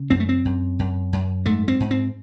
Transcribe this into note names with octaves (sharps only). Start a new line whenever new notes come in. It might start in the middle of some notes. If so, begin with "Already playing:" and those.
Already playing: C#3
F#2 C4
A3
C4
F#2
F#2
F#2
G#2 A3
C4
G#2
C4